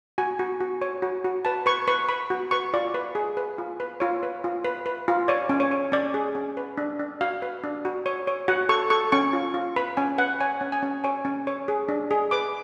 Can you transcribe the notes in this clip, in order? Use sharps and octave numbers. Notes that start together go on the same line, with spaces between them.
F#4 G#5
F#4
F#4
C#5
F#4
F#4
B4 A5
B4 C#6
B4 C#6
B4 B5
F#4
B4 C#6
F4 D5
B4
G#4
B4
F4
B4
F4 C#5
B4
F4
B4
B4
F4
C#5 D5
C#4
C#5
C#5
C#4 D5
G#4
C#4
B4
D4
D4
F#4 F5
B4
D4
F#4
C#5
C#5
F#4 F#5
A4 C#6
A4 C#6
C#4 C#6
F4
F4
B4 B5
C#4 G#5
B4 F#5
C#5 G#5
C#4
G#5
C#4
C#5 G#5
C#4
C#5
G#4
D4
G#4
B4 D6